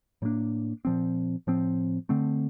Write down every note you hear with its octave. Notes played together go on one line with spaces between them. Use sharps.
A2 G3 A#3 D4
A#2 F3 C4
A2 F3 C4
D3 A3 C4